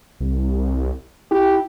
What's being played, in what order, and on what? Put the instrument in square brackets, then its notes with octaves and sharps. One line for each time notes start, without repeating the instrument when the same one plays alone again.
[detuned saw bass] C2
[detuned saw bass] E4 [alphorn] G4